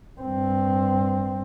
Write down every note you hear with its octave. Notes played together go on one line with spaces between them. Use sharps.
G2 C4